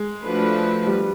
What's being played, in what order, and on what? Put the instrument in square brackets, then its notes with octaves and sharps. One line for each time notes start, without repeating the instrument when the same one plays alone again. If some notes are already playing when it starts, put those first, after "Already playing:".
Already playing: [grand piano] G#3
[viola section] F3 A3 D4 F#4 B4
[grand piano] G3